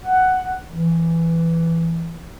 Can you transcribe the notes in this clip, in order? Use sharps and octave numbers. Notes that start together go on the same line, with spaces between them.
F#5
E3